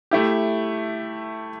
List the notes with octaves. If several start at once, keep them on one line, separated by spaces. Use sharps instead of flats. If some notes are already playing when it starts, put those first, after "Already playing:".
A3 E4 G4